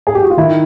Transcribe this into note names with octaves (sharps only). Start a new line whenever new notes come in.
G#4
G4
F#4
F4
D#3 E4